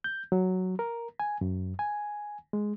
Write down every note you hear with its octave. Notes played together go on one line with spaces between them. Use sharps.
G6
F#3
A#4
G#5
F#2
G#5
G#3